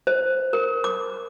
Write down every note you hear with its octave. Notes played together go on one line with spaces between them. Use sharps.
C5
A#4
D6